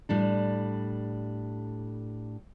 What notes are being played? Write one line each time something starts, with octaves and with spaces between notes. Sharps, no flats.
A2 G3 D4